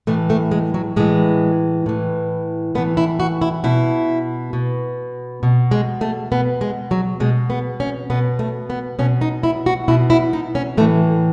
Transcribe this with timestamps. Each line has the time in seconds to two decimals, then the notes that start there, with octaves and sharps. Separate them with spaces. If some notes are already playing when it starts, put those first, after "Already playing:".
0.07 A2 E3 A3
0.30 A3
0.52 G#3
0.74 F#3
0.96 A2 E3 G#3
1.86 A2 E3
2.75 A2 B3
2.78 E3
2.97 E4
3.20 F#4
3.42 E4
3.64 B2 E4
4.53 B2
5.43 B2
5.71 G#3
6.01 A3
6.32 B2 B3
6.61 G#3
6.91 F#3
7.20 B2 G#3
7.50 B3
7.80 C#4
8.10 B2 B3
8.39 A3
8.70 B3
8.99 B2 C#4
9.21 D#4
9.43 E4
9.66 F#4
9.88 B2 E4
10.10 E4
10.33 D#4
10.55 C#4
10.77 A2 E3 A3